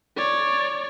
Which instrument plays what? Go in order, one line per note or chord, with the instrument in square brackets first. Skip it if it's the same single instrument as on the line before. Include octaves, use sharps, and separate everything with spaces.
[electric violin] C#5 D5